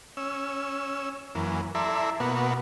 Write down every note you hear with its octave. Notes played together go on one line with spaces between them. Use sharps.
C#4 E6
F#2 E3 A#3
E4 A4 D5 E5 A#5 C6
B2 A#3 B3 F#4